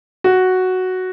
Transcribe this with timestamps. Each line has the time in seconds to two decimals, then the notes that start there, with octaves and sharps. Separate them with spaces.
0.24 F#4